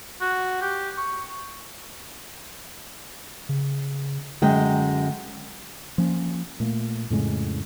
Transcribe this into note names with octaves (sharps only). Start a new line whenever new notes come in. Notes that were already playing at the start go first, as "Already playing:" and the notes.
F#4
G4
C#6
C#3
F#2 D3 G#3 G5
F3 A#3 C#4
A#2 A3 A#3
F2 A2 C#3 G#3